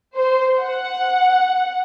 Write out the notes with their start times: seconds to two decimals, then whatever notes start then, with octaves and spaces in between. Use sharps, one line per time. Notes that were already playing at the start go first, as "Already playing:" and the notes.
0.15 C5
0.59 F#5